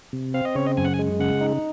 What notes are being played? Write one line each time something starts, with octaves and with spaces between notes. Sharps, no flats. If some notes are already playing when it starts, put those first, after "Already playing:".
C3
C4 F5
D#5
C#3 C#5
D#5
F#2 G#5
F#5
G#5
G#3
C#3 F#5
D#4